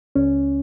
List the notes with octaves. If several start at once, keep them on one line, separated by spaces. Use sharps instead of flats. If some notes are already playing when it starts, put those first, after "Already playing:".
C#2 C#4